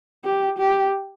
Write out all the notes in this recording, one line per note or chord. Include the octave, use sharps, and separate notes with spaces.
G4
G4